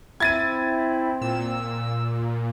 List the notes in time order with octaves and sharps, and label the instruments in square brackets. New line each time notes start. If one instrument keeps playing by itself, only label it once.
[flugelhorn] C4 [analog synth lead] E4 [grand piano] G#6 A6 D#7
[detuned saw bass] A#2 [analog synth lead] E6